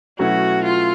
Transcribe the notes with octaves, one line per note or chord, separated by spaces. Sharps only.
B2 F#3 A3 C#4 E4 F#4
F4